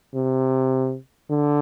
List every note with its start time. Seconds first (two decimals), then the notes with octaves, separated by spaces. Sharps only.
0.15 C3
1.30 D3